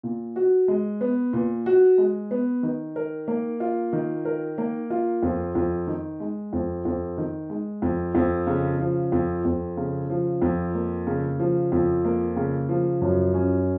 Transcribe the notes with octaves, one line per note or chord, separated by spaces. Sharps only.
A#2
F#4
G#3
B3
A#2
F#4
G#3
B3
D#3
A#4
A#3
F4
D#3
A#4
A#3
F4
F2
F2
D#3
G#3
F2
F2
D#3
G#3
F2
F2
C#3
F3
F2
F2
C#3
F3
F2
A#3
C#3
F3
F2
A#3
C#3
F3
F#2
C#4